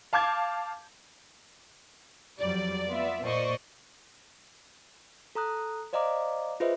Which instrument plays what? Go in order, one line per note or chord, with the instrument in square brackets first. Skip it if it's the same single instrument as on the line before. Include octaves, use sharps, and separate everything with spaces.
[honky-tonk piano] F5 A5 D6 G6 G#6
[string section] F2 F#3 G3 [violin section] D5
[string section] B3 F4 E5
[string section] A#2 C#6 [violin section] C5 D5 D#5
[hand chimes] A4 A#5 D#6 F#6
C5 D5 D#5 F5 A#5 D6
F4 G#4 B4 C5 D#5 E5